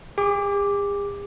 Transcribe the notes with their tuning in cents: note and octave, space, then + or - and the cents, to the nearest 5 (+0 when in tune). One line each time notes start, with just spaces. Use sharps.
G#4 -45 D6 +0